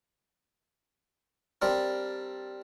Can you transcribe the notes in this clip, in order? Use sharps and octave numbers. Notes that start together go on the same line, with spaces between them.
G3 C4 D4 A#4